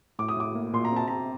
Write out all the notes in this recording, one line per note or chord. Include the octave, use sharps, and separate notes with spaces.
A2 D6
D#6
A2 D6
A#3
A#2 C6
A#5
C4 A5
C4 A#5